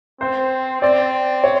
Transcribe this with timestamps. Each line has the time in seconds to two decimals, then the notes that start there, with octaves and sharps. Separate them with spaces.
0.20 C4 C5
0.82 C4 D5
1.44 C#5